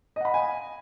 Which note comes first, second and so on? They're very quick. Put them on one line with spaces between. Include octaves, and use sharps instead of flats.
D#5 F#5 B5 F5 G#5